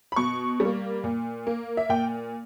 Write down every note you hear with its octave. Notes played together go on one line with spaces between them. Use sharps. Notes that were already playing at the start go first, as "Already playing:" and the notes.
B5
B2 C#6
G3 A#3
A#2
A#3
E5
A#2 G5